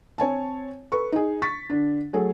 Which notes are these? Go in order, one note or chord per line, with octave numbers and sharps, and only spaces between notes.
C4 C#5 G#5 A5
A4 B4 C#6
D#4 G#4
C#6 A6 B6
D3 D4
F#3 A3 G#4 A4